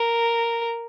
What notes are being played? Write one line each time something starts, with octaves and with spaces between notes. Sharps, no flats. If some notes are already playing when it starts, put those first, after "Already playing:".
Already playing: A#4